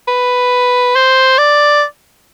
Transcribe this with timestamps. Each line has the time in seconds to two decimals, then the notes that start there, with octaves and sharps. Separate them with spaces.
0.08 B4
0.95 C5
1.38 D5